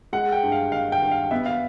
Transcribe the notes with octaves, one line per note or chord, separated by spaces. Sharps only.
G#3 F#5
G5
G2
F5
D#3 F5
G5
G2
F5
B3 E5
F5